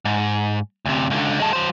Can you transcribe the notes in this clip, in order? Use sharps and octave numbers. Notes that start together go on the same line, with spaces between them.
G#2
D2 C3
C#2 D3
G#3 A4
F#3 C5